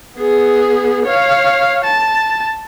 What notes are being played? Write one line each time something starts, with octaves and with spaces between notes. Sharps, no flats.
B3 G#4
C#5 F5
A5